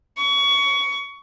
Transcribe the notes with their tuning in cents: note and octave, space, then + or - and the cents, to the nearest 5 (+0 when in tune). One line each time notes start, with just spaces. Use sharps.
C#6 +25